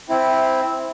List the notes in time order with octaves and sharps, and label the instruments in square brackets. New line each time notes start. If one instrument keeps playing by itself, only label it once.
[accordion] C4 [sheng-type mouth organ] E4